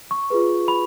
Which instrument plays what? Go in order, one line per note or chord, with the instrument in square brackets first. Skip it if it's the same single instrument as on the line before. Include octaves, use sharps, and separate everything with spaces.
[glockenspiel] C#6
[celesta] F4 G#4 B4
[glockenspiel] B5